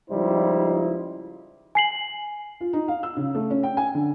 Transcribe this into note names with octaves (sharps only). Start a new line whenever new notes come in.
C#2 F3 G3 D#4 E4 C5
G#5 C7 F#7
F4
D#4
F5
E6
C#3
A3
C#4
G5
G#5
D3